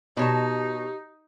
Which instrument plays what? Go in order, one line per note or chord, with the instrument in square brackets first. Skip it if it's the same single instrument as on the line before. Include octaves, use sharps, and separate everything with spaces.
[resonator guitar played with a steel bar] B2 C#5 A5 [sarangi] D#4 [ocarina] G4